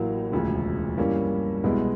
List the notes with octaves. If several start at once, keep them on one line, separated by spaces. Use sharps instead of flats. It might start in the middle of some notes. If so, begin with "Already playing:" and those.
Already playing: A1 A2 F#3 A#3
E1 D2 C#3 F3
G2 E3 G3 A#3 C#4
C2 B2 G#3 B3 E4